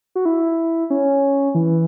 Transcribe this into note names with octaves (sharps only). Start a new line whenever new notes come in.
F#4
E4
C#4
E3